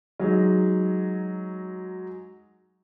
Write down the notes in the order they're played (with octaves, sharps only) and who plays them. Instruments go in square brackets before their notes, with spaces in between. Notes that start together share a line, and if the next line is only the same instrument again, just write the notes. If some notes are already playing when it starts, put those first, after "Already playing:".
[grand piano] F#3 G#3 D#4